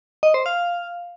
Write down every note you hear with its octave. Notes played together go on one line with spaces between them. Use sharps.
D#5
C5
F5